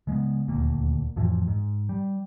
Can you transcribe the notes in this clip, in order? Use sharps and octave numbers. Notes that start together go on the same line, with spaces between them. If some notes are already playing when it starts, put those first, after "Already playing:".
C#3 G#3 A#3 B3
D#1 D2 D3 A#3
F2 A2 E3 F3
G#2
G3